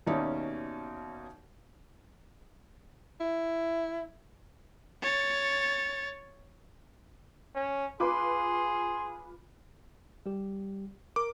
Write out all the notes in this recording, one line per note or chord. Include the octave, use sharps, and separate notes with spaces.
D#2 B2 C#4 D#4 D5 E5
E4
C#5 A6
C#4
F4 G#4 B4 C6 D6
G3 G4
A#4 D6